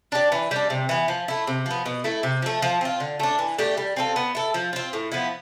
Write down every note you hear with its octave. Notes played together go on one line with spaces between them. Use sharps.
D4 G4 D5
E3
G3 D4
C3
E3 B3
F3
A3 E4
C3
F3 B3
B2
A3 E4 A4
C3
F3 A3
F3
C4 F4
D3
A3 D4
E3
A3 D4 G4
G3
C4 F4 A4
B3
E4 A4
F3
C4 F4
A2
F3 B3 E4